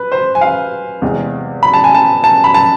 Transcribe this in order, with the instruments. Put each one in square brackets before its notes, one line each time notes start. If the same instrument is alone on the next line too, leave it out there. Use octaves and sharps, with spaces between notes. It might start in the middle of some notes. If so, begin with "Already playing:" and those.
Already playing: [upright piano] B4
C5
G#5
F5
E2 C3 G#3
B5
A5
G#5
A5
A5
B5
A5